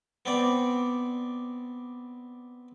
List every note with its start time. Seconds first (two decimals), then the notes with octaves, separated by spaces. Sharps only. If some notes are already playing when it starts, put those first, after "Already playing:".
0.26 B3 C4 D5